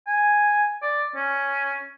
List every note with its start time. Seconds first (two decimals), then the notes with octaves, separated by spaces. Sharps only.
0.07 G#5
0.82 D5
1.15 C#4